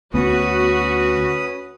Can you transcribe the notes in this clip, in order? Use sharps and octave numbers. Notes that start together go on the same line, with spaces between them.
D2 B3 C#4 F#4 B4 D#6